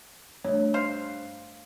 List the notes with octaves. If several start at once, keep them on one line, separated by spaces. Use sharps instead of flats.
G2 A3 D4 C#5
C5 F5